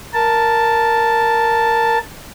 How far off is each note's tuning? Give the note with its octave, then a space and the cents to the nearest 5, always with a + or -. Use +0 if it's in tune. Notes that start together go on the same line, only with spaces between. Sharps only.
A#4 +0 A5 +0